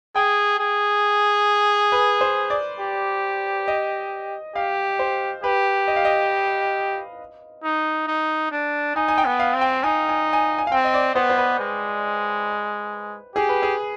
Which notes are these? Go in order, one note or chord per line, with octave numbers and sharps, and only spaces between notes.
G#4 G5
G#4
B4
C5
D5
G4
D#5
G4 F5
C5
G4 B4
D#5
F5
D#5
D#4
D#4
D4
D#4 G#5
G#5
G5
B3
F5
C4
G5
D#4 G#5
G#5
G#5
G#5
F5
C4 G5
D#5
D5
B3 C5
C5
B4
G#3
G4 G#4
B4
G#4